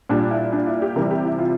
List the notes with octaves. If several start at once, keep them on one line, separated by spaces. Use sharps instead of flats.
A#2 G3 D4
E4
D4
E4
G4
C3 E3 G3 A#4
G4
E4
F4